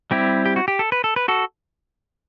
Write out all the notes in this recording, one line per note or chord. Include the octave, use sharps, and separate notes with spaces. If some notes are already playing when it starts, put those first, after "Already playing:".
G3 C4 E4 G4
G4
F#4
G4
A4
B4
A4
B4
F#4 A4